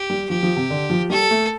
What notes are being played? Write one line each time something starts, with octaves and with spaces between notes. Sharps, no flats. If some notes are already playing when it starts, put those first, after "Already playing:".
Already playing: G4
G3
F3 G4
F3
C3
D3
F3
G3 A4
A3